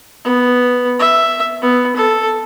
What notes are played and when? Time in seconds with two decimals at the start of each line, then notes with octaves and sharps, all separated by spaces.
0.24 B3
0.99 E5
1.62 B3
1.96 A4